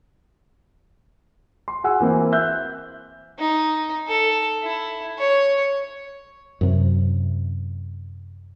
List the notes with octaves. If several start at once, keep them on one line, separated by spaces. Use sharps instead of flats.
C6
F#4 G#4 F#5 E6
E3 A#3 C4
E5 E6 F#6 G6
D#4
A4
E4
C#5
F#2 C3